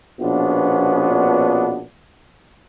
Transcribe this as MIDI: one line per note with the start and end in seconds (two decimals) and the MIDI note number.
0.20 1.82 34
0.20 1.82 47
0.20 1.82 53
0.20 1.82 59
0.20 1.82 61
0.20 1.82 62